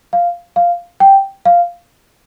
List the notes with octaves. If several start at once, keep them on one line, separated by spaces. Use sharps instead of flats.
F5
F5
G5
F5